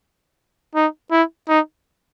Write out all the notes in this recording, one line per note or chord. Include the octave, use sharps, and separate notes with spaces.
D#4
E4
D#4